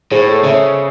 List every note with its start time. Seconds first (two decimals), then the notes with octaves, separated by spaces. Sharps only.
0.11 A2 G#4 C5
0.28 A4 C#5
0.44 C#3 C#5 E5